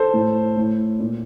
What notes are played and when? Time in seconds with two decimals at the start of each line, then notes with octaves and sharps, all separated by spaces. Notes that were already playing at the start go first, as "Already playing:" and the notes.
Already playing: A4 C5
0.14 A2
0.57 A2
1.00 A#2